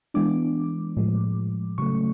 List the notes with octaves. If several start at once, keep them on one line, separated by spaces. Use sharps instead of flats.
E3 G#3 B3 D4 D6
A2 F3 G#3
C#3 F#3 A3 C#6